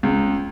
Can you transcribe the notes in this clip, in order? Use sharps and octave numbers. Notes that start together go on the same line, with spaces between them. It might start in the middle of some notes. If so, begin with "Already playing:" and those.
C#2